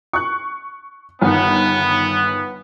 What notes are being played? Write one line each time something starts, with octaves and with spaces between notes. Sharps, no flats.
C#6 F#6
G1 D#3 B3